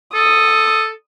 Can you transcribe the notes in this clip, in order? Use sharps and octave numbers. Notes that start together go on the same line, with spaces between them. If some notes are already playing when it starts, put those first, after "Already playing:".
A4 D#6